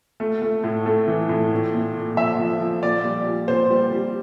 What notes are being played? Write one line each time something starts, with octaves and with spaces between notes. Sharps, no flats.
A3
A3
A2
A3
E3
A2
A#2
A#2
A#2
F3 E5
F3
F3
A#2 D5
G3
A#2
A#2 C5
G3
G3